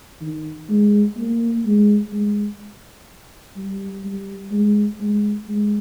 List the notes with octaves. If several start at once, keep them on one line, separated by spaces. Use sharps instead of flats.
D#3
G#3
A#3
G#3
G#3
G3
G3
G#3
G#3
G#3